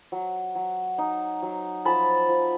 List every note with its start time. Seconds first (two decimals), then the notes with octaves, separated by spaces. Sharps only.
0.12 F#3
0.55 F#3
0.98 D#4
1.42 F#3
1.85 F3 A5 B5
2.29 F3